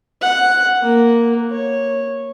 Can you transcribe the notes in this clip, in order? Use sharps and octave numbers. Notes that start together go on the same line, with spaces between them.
F#5
A#3
C#5